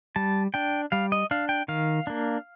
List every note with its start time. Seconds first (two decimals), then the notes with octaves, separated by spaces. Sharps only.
0.16 G3 A5
0.54 D4 G5
0.92 G3 F5
1.12 D#5
1.31 D4 F5
1.49 G5
1.68 D#3 F5
2.07 A#3 D4